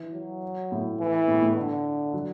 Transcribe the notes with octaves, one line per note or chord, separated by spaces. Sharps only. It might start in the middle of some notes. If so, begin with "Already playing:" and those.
Already playing: E3
F#3
A2
E3
A2
A2
D3
F#3